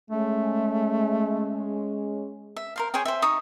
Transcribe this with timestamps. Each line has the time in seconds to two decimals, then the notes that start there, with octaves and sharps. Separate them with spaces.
0.11 G#3 A3 C#4
2.56 E5
2.76 A#4 C5 F5
2.94 G#4 C5 C#5 G5
3.05 C5 E5
3.22 D#4 E5 C#6 D#6